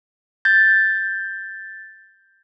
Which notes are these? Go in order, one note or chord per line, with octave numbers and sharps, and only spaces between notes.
G6 A6